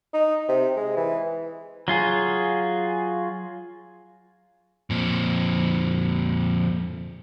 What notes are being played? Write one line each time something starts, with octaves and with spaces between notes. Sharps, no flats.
D#4
C3
G#3
E3
F#3 F4 G#4
F2 A#2